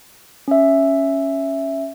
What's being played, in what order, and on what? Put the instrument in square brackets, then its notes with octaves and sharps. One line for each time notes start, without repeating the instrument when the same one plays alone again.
[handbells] C#4 E5